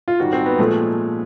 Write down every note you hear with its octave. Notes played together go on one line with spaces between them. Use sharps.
F4
G#2 D#3 G3 F#4
C4
B3
A#2 F3 G#3 A3